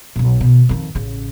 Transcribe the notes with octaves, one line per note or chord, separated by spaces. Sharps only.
B1 B2
B2 D#3
F2 D#3
A1 C#3